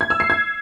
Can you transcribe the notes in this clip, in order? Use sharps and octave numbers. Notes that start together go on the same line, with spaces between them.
G#6
E6
C7
G#6